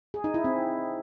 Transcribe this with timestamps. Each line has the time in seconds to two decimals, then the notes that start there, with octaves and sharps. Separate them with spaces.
0.14 G#4
0.24 D#4
0.34 E4
0.44 C4